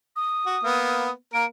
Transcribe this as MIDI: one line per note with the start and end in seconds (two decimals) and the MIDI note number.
0.16 1.11 87
0.46 0.57 66
0.63 1.11 58
0.63 1.11 59
1.33 1.45 58
1.33 1.45 70
1.33 1.46 98